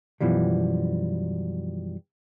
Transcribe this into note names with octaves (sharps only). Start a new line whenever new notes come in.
F#2 B2 E3 F3 G3